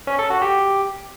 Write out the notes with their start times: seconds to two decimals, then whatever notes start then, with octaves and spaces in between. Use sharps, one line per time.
0.07 C#4
0.19 A4
0.30 F#4
0.42 G4